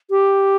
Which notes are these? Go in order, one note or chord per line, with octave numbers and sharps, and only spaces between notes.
G4